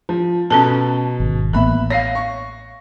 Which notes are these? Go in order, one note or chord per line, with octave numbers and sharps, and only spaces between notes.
F3
B2 C#4 A4 A5
G#1
A1 A#3 B3 E5 B5 F#6
C#5 F5 A#6 C7
C#6